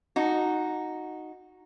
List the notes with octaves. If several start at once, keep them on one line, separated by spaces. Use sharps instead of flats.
D#4 F#4